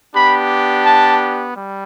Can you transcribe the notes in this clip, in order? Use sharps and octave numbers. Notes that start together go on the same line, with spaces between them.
B3 D4 G4 B5
A5
G3